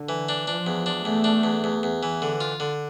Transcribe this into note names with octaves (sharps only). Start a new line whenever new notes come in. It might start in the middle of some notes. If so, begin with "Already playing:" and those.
Already playing: D3
E3
D4
F3 D4
E2
D4
E2 A3
D4
E2
E2
E2
E3
D3
F4
D3